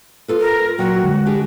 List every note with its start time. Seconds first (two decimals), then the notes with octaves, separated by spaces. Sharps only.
0.28 F4 A4 B4
0.40 A#4
0.78 A#2 F#3 F#4 G5
1.04 D3 G#3
1.26 D4 G4 G#4